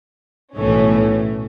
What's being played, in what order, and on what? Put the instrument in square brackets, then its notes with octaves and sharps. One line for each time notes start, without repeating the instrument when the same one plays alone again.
[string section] B1 A2 E3 A3 C#4